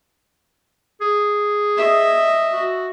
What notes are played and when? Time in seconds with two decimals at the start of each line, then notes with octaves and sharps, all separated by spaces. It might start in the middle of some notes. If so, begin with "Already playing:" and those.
1.01 G#4
1.77 D#5 E5
2.53 F#4